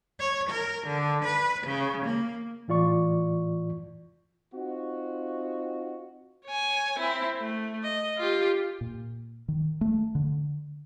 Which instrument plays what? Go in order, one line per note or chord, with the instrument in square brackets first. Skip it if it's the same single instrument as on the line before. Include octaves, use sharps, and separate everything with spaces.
[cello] C#5
A#4
D3
B4
C#3
A#3
[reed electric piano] A2 E3 F4 D5 C#6
[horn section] C4 D#4 F4 F#4
[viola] C#5 G#5
C4 E4
A3
D#5
F4 G4
[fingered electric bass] A#2
D#3
A3
D3